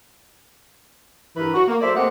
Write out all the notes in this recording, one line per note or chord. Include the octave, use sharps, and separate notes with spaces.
G2 E3 A#4 B4
F#4
A#3
F#3 A4 C5 D5 E5
A3 A#3 C4 G4 D#5 F#5